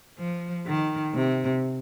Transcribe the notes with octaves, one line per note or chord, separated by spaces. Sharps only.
F3
D#3
C3